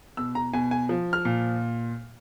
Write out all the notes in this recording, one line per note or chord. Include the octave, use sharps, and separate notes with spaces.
B2 E6
A#5
B2 G#5
G#5
F3
F6
A#2